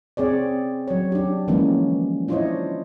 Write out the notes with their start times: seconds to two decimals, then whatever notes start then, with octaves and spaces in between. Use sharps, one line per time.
0.17 C4 G#4 C#5 D5
0.88 F#3 C#5
1.12 D4 G4
1.48 D3 E3 F3 G#3 A#3 C#4
2.28 D4 E4 F4 C5 C#5 D#5